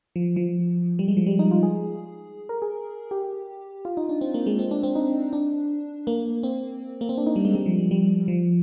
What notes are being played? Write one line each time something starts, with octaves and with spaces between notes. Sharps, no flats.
F3
F3
G3
G#3
F3
G3
D#4
F4
G#4
A#4
G#4
G4
F4
D#4
D4
C4
A#3
G#3
C4
D4
C4
D#4
D4
A#3
C4
A#3
C4
D4
D#4
G3
G#3
G3
F3
G3
G3
F3